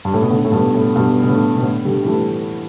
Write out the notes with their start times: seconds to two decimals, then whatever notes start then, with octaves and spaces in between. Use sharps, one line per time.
0.05 G2
0.14 A2
0.22 B2
0.30 A2 D3
0.45 A2
0.52 G2 B2
0.74 A2
0.96 G2 B2
1.24 B2
1.29 A2 D3
1.57 B2
1.62 A2 D3
1.85 D3 G3
2.02 G3
2.06 E3 A3